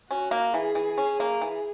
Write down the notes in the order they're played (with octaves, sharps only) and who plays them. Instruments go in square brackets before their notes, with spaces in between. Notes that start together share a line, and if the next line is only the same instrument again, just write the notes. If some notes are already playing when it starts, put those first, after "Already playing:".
[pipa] C#4 [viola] F#4
[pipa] A#3
[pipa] E3 [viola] G#4
[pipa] E3
C#4
A#3
[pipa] E3 [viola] G#4